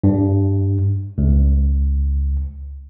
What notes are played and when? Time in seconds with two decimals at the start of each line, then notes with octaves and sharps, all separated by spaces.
0.04 G2
1.18 C#2